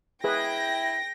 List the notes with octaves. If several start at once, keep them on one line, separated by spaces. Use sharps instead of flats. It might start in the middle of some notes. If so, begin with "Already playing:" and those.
E4 G#4 B4 G5 A#6